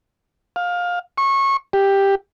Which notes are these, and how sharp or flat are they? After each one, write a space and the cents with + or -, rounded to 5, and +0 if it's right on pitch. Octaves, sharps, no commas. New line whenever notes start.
F5 +20
C#6 -25
G4 +5